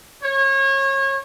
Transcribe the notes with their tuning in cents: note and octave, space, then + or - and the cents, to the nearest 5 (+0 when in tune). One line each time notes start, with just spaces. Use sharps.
C#5 -30